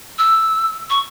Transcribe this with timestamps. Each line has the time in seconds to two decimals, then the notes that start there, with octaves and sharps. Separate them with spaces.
0.18 E6
0.90 C#6